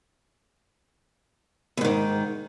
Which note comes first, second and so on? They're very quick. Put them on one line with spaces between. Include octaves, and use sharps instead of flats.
E2 G#2 D#3